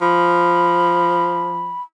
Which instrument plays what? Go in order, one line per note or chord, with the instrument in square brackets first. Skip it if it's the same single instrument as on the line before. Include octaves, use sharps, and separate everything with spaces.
[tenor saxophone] F3 [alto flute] B5